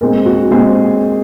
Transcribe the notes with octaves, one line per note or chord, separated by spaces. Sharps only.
A#2 G#3 C4 A#4
F#4
A#2 G#3 C4 G#4